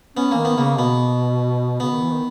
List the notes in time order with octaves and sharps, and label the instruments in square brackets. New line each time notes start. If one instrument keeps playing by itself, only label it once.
[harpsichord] B3 [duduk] C#4
[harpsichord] A#3
[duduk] D#3
[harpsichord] B3
[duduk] C#3 [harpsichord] A#3
[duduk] B2 [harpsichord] B3
[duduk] C#3 [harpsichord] B3
[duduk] D#3
E3
D#3